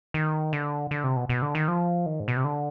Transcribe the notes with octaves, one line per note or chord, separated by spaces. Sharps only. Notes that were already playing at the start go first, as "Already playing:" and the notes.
D#3
D3
D3
C3
B2
B2
D3
D#3
F3
D#3
G#2
B2
C3
D3